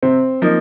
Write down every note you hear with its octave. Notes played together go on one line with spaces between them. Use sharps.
C3 C4
F3 A#3 D#4